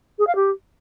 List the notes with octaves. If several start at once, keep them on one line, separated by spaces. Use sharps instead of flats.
G#4
F5
G4